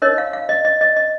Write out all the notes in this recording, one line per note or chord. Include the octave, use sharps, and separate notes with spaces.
D#4 A#4 C#5 D#5
F5
F5
D#5
D#5
D#5
D#5